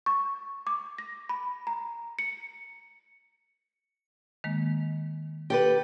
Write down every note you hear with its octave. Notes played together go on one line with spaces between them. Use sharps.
C#6
D6
A#6
B5
A#5
C#7
D#3 G#3 A#3
G4 A4 B4